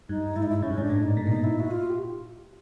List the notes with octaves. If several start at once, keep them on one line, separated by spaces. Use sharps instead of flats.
G2 D#4
G#2 E4
D#4
E4
G#2 C#4
G2
G#2 D#4
D4
A2
D#4
A#2
B2 D#4
A#2
E4
F#4
F4
G4